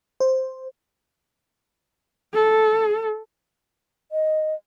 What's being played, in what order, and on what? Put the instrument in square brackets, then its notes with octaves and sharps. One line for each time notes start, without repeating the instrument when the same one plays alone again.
[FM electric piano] C5
[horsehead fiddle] A4
[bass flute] D#5